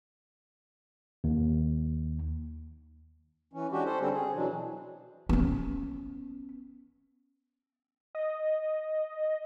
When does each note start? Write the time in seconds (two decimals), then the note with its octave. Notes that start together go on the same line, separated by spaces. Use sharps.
1.24 D#2
3.53 E3 C#4
3.72 G#3 C#4 D4 F#4 G4
3.85 A4 C5
4.00 D3 G3 C4 C#4
4.13 G#4
4.35 B2 E3 F#3 D4
5.29 B3 C#4
8.15 D#5